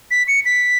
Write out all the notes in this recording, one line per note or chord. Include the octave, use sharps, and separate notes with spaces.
B6
C#7
B6